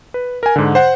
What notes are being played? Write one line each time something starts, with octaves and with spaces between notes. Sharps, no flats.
B4
A#4 G#5
G#2 D3
C5 F#5